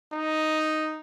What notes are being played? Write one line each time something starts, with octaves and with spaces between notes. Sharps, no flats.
D#4